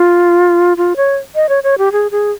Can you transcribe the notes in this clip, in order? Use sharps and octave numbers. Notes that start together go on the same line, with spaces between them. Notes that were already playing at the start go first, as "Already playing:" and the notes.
Already playing: F4
F4
C#5
D#5
C#5
C#5
G4
G#4
G#4